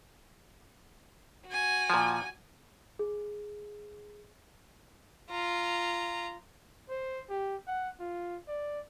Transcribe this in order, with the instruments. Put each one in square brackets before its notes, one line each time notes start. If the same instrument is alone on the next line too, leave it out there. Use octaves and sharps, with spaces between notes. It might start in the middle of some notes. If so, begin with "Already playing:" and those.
[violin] F#4 G#5
[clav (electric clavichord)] A#2 F3
[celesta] G#4
[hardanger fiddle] F4 A#5
[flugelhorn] C5
G4
F#5
F4
D5